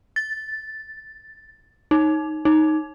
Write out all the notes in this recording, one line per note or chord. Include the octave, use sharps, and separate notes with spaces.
A6
D#4
D#4